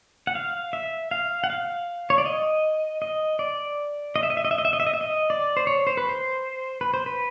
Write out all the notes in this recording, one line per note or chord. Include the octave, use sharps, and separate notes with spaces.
F#5
F5
E5
F5
F#5
F5
C#5
D5
D#5
D#5
D5
D#5
E5
D#5
E5
D#5
E5
D#5
E5
D#5
E5
D#5
E5
D#5
D5
C5
C#5
C5
B4
C5
B4
C5
B4